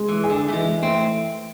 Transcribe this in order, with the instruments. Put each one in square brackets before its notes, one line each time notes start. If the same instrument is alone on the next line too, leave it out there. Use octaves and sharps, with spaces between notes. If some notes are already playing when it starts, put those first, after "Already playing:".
Already playing: [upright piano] G#3
[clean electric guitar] E3
[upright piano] G#4
[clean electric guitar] D3
A3
[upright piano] E3 [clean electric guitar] G#3
[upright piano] A3 [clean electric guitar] C4